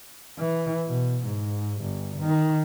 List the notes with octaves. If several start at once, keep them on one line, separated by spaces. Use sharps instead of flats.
E3
B2
G#2
G1
D#3